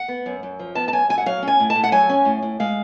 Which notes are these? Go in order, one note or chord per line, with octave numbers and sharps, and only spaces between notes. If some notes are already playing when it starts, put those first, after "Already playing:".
Already playing: F#5
B3
F#2
F#2
F3
B3 A5
A5
F#2 G#5
F#2 G#5
F#5
F#3 F5
C#4
G#5
A2
A5
A2
F#5
F#3 G#5
C#4
A2
A2
G#3 F5